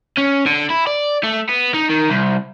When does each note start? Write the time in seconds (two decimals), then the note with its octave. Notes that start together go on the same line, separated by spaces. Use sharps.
0.18 C#4
0.47 D3
0.70 E4
0.87 D5
1.23 A3
1.49 B3
1.74 D#4
1.90 D#3
2.10 C2